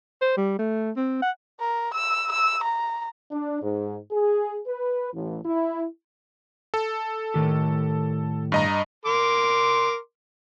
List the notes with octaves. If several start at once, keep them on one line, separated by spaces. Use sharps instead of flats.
C5
G3
A3
C4
F#5
A#4
E6
E6
A#5
D4
G#2
G#4
B4
A1
E4
A4
A2 D#3 G4
G2 D#5 A#5
A#4 C6 D6